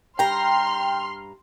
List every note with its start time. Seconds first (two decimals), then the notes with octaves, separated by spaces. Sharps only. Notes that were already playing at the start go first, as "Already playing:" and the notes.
0.19 G2 G5 A#5 C6 F6